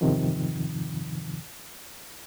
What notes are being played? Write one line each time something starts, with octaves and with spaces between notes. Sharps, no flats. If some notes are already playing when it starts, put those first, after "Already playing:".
E2 G2 C3 D#3 F3